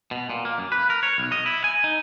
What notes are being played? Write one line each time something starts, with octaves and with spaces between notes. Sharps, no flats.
B2
A#2
A#3
F#2
B4
A#4
C#5
B1
D#5
E4
G#5
D#4